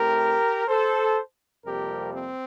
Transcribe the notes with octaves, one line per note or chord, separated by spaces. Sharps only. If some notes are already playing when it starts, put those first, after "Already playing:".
Already playing: A2 A3 C4 G4 A#4
A4 C5
F2 C3 G3 A#3 G4 A#4
C4